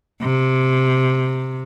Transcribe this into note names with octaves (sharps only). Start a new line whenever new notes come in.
C3